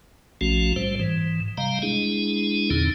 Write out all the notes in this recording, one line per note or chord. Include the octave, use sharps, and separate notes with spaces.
A#1 F3 A3 C#4 F#4
A2 G3 C5
G#2 E3
C3 G3 D#5 F5 A#5
G#3 D4 E4 G#4
E2 A#2 D3 C4 D#4